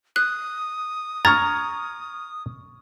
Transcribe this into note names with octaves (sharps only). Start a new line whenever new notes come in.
D#6 F#6
A#5 C#6 F6 G#6 A6